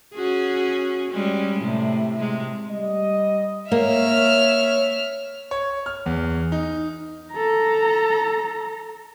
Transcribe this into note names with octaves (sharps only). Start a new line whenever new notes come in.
C#4 F#4 G#4
G3 G#3 C#4
A2 C3
C3 G#3
G3 D#5
A#3 C#5 E5 F6
C#5
F6
E2
D#4
A4 A#5